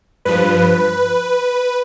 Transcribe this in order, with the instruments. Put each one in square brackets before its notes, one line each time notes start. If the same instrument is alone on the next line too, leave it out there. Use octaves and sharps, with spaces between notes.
[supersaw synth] G2 F3 B4